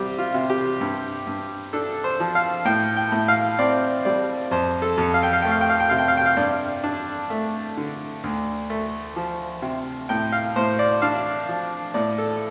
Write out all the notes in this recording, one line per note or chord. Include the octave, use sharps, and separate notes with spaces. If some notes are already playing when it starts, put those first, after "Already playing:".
Already playing: C2 G3 C4 G4
F4
C3
G4
G2
G2
D4 A4
C5
F3
F5
A2 G5
G5
A2
F5
C4 D5
G3 D5
F2 C5
A4
F2
F5
G5
F5
A3 G5
F5
G5
F5
G5
C3 F5
G5
F5
G5
F5
G2 D5
D4
A3
D3
D2
A3
F3
C3
A2 G5
F5
A2 C5
D5
D4 F5
F3
A2 D5
A4